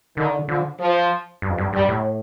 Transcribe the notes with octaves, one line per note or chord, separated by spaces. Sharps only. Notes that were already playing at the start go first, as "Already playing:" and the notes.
D3 D#3
D3 F3
F3
G2
F2
G2
G2 G3
A2